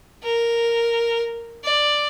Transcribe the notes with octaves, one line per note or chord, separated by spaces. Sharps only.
A#4
D5